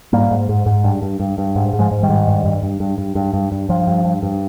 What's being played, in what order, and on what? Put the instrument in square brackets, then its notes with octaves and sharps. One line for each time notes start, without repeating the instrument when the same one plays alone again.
[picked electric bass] G#2 G3 A#3
G#2
G#2
G#2
G2
G2
G2
G2
G#2
G#2
F3 G#3
G#2
D#3 G3
G#2
G2
G2
G2
G2
G2
G2
G2
G2
G2 F3
G2
G2
G2